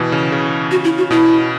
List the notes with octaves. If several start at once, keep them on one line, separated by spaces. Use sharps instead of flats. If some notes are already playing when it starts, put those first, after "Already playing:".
Already playing: B2 E3
C#3
C#3
F#4
E4
F#4
B2 E4